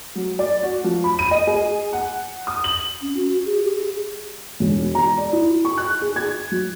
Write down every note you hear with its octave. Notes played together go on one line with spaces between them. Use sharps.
F#3
D5
F#4
F3
B5
D#7
D#5
G#4
F#5
D#6
F#7
C#4
F#4
F#4
G#4
G4
G#4
E1
A#5
D5
E4
C#6
F#6
G#4
G#6
F#3